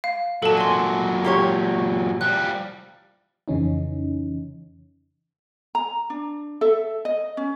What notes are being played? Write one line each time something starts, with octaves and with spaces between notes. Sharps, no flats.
F5
A#2 F#3 A4 A5
G#5 C6
A#3 G4 C#5
F3 G3 F#6
F2 C#3 E3 C#4 D#4
A#5
D4
A4 E5
D#5
C#4